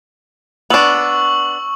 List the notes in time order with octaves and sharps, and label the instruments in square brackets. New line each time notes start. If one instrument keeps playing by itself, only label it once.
[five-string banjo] B3 D4 [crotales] C#6 E6 F#7